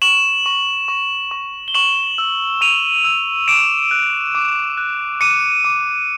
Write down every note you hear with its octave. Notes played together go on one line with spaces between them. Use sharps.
C#6 E7 F#7
C#6
C#6
C#6
G7
C#6 E7 F#7
E6
C#6 D#7 F7
E6
D6 D7 E7
F#6
D6
F#6
D6 C#7 D#7
D6